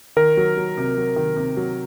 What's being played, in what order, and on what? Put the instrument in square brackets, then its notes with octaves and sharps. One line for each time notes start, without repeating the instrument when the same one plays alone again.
[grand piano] D#3 [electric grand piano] A#4
[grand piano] F#3
F#3
C3
F#3
D#3
C3
F#3